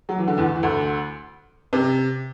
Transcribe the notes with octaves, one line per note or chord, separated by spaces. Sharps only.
F#3
E3
D3
E2 E3
E3
D2 D3
C3